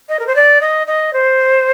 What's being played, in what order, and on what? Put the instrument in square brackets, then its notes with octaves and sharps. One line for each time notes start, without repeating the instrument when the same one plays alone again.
[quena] D#5
A#4
C5
D5
D#5
D#5
C5